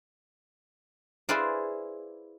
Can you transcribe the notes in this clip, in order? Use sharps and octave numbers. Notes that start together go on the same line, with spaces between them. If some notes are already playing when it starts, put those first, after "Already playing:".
E4 G#4 B4 C5 D5 F5